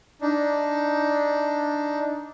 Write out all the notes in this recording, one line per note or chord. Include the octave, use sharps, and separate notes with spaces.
D4 D#4